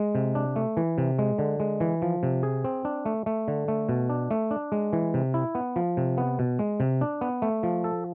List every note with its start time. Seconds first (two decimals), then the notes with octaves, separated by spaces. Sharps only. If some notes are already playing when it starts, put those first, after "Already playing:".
Already playing: G#3
0.15 C3
0.35 D4
0.56 A3
0.77 E3
0.98 C3
1.19 G#3
1.39 D3
1.60 G#3
1.80 E3
2.02 F3
2.23 C3
2.43 G#4
2.64 C4
2.85 D4
3.06 A3
3.26 A3
3.48 D3
3.68 A3
3.89 B2
4.09 D4
4.31 A3
4.51 D4
4.72 G#3
4.93 E3
5.14 C3
5.34 E4
5.55 B3
5.76 F3
5.97 C3
6.18 B3
6.39 B2
6.59 G#3
6.80 C3
7.01 D4
7.21 B3
7.42 A3
7.63 F3
7.84 A4